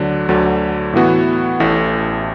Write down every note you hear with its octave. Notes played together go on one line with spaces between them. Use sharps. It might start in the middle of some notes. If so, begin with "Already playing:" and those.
Already playing: D2 D3 F#3 D4
D2 D3 F#3
A2 E3 B3 F#4
A1 A2 A3